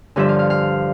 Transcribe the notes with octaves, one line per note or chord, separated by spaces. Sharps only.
G2 D3 F3 E5
F5
F5
F5